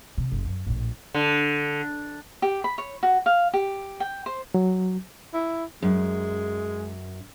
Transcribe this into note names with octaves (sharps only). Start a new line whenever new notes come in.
C3
F#1
F#2
A#1 A2
D3
G4
B5
C#5
F#4
F5
G4
G5
C5
F#3
E4
F#2 G#3